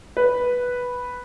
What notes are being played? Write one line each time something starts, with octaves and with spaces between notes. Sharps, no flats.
B4